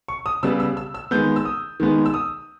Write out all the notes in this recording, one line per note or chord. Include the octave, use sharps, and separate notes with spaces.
C#6
D#6
C#3 G3 B3 E6
E6
E6
E6
D#3 G#3 B3 G6
E6
D#6
D#3 G#3 B3
E6
D#6